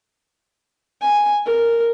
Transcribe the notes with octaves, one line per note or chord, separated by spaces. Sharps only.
G#5
A#4